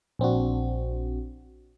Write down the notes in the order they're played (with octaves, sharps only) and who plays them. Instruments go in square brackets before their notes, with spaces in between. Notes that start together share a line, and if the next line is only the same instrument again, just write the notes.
[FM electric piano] A#1 C4 D4 F#4